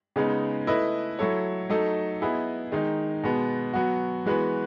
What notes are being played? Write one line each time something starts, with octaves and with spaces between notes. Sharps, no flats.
C#3 G#3 B3 D#4
A3 E4 B4 D#5
F#3 A3 E4 A4 C#5
F#3 A3 D#4 A4 D#5
B3 E4 G#4 D#5
D#3 G#3 D#4
B2 G#3 B3
F#3 B3 F#4
E3 G#3 B3 F#4 B4